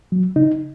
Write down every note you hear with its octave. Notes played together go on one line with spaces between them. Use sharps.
F#3
C#3 D#4